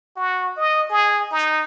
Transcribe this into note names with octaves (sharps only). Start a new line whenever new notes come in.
F#4
D#5
G#4
D#4